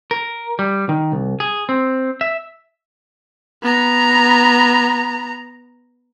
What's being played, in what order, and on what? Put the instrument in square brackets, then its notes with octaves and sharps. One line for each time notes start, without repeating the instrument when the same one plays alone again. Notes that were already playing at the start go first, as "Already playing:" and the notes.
[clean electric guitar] A#4
G3
D#3
C2
G#4
C4
E5
[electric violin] B3 A#5